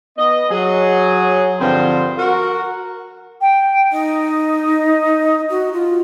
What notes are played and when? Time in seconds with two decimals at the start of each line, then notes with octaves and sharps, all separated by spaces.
0.17 B3 D#5
0.50 F#3 G#4
1.60 G2 D3 F3 C4 C5
2.18 F#4 A#4
3.41 G5
3.92 D#4 D#5
5.50 F#4
5.73 F4